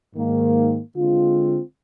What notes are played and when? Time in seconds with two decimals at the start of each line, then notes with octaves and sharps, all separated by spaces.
0.15 G#2 D#3 A#3
0.95 D3 G#3 C4 F4